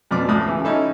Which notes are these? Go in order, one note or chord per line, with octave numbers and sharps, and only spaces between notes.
F2 B2 F3 D5 D6
C#2 A2 D#6
C#3 E3
C#4 D#4 E4 A4